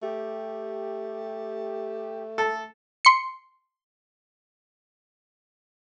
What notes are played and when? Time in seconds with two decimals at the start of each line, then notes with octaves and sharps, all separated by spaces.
0.03 A3 G4
2.38 A4
3.05 C6 C#7